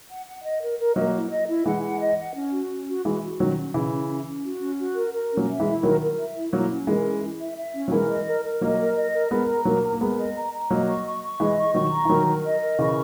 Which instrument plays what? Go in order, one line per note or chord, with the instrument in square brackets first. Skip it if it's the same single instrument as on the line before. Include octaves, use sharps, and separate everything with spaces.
[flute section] F#5
F#5
D#5
A#4
A#4
[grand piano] F#3 A#3 [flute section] D#5
[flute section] E4
D#5
E4
[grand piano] E3 G#3 [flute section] F#5
[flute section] F#5
D#5
F#5
C#4
F#4
C#4
F#4
[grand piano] E3 G#3 [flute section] F#4
[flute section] F#4
[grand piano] D#3 F#3 [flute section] C#4
[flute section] C#4
[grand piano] C#3 E3 [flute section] C#4
[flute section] C#4
C#4
C#4
F#4
C#4
F#4
A#4
A#4
C#4
[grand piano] F#3 A#3
[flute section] E5
[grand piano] E3 G#3
[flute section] E4
[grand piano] D#3 F#3 [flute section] A#4
[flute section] A#4
E5
E4
[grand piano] F#3 A#3 [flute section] E4
[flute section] C#4
[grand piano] E3 G#3 [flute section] A#4
[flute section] C#4
E4
E5
E5
C#4
[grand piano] F#3
[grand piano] E3 G#3 [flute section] A#4
[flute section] D#5
A#4
A#4
[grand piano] F#3 A#3 [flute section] D#5
[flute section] A#4
D#5
A#4
[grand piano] G#3 B3 [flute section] A#4
[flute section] A#5
[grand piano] F#3 A#3 [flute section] A#4
[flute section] A#5
[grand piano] A#3
[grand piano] G#3 B3 [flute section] A#4
[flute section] D#5
A#5
A#5
[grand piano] F#3 A#3 [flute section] D#5
[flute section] C#6
C#6
C#6
[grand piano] E3 G#3 [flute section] D#5
[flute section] C#6
[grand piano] D#3 F#3 [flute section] C#6
[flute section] A#5
[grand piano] E3
[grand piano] D#3 F#3 [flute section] A#4
[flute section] A#4
D#5
A#4
[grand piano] C#3 E3 [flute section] C#6